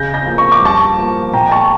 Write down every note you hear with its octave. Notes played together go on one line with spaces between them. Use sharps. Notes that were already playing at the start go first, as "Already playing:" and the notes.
Already playing: C#3 G6 A#6
G6 A#6
F3 A#3
C#6
D6
G2 A5 C#6
F3 A#3
A#2 G5 A#5
A5 C#6